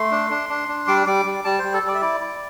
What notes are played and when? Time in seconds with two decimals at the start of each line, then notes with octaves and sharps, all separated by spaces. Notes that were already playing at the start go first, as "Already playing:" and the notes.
Already playing: A3 C6
0.11 D4
0.30 D4
0.49 D4
0.68 D4
0.87 G3 D6
1.07 G3 D6
1.25 G3
1.44 G3 A5
1.58 G3 C5
1.73 A4
1.82 G3 D5
1.95 E5
2.01 E4 D5
2.20 E4